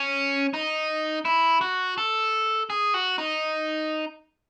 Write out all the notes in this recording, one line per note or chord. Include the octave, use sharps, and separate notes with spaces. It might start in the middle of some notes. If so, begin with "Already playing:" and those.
Already playing: C#4
D#4
E4
F#4
A4
G#4
F#4
D#4